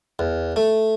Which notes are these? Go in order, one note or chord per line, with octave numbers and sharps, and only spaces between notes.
E2
A3